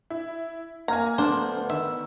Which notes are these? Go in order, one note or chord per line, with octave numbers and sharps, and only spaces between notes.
E4
A#3 G#5 A#5 F6 G#6
D2 B3 D4 C5
D#3 E5